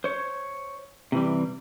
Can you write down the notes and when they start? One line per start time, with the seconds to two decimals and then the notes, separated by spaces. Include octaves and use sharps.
0.04 C5 C#5
1.12 C3 E3 G3